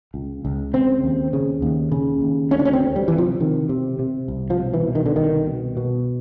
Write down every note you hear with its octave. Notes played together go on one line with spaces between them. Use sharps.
C#2
C#2
C#3 C4
D#2
C#3
D#2
C#3
D#2
D2 C#4
D4
C#4
C4
D2
G3
C3 E3
F3
C3 D#3
C3
C3
C2
F3
B2
E3
B2
D#3
D3
C2 D#3
B2
B2